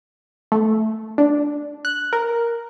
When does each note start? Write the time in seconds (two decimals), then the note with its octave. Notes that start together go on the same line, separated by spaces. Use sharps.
0.52 A3
1.18 D4
1.85 F#6
2.13 A#4